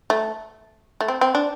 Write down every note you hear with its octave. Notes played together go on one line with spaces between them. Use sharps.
A3
A3
C4
C4
D4